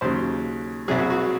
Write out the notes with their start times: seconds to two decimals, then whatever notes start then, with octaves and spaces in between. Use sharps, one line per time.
0.01 D#2 C#3 F#3 C5
0.88 C2 C3 F#3 G#4
0.99 F#4
1.10 F#4